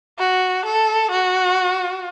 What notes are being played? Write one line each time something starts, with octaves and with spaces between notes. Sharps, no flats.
F#4
A4
F#4